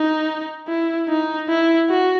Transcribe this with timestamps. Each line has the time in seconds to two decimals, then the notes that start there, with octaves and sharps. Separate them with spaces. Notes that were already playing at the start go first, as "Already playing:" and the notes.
Already playing: D#4
0.68 E4
1.09 D#4
1.49 E4
1.90 F#4